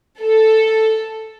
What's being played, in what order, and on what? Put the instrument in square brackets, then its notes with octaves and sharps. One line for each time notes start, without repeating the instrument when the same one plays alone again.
[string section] A4